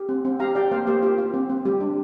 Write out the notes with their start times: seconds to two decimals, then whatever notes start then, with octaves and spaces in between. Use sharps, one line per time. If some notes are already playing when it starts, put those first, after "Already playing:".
Already playing: G4
0.09 C4
0.25 C4
0.40 G4 F5 A#5
0.55 G4 D5 G5
0.71 A#3 C5 F5
0.87 A#3 G4 C5
1.02 F4 G4
1.18 F4
1.34 C4
1.50 C4
1.65 G3 G4
1.80 D4